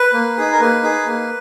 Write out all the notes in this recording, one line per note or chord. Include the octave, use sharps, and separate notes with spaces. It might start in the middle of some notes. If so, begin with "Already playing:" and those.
Already playing: B4
A#3
D#4 G#4
A#4
A#3 B4
D#4 G#4
A#3